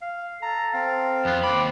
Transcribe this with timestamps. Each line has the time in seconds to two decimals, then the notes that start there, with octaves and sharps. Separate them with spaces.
0.02 F5
0.43 A4 A#5
0.74 C4 F5
1.25 F2 B3 F4
1.43 D#2 B5 D6